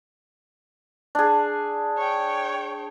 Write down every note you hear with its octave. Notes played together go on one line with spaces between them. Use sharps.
D4 G#4
C#5 G5